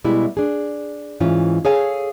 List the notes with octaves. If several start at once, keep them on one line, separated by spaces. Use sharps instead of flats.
B2 G3 G#3 E4
D4 G#4
G#2 E3 C#4 F4
G#4 A4 C#5 F5 G#5